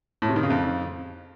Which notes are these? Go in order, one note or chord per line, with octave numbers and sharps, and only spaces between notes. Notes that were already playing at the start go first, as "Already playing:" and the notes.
A2
C3
D#3
C#3
F2